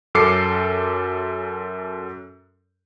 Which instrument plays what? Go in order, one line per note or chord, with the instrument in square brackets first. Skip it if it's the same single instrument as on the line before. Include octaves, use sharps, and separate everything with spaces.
[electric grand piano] F#2 C#4 A4 D6 C7 C#7